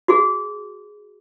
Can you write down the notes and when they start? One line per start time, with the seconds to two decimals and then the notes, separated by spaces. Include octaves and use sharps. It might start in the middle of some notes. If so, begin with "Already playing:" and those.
0.08 F#4 G#4